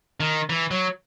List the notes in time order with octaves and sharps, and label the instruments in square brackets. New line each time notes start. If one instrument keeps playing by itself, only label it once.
[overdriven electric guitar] D#3
E3
F#3